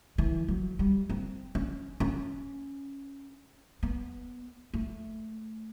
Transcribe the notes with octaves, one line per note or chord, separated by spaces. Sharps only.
E3
F#3
G3
C4
C#4
C#4
B3
A3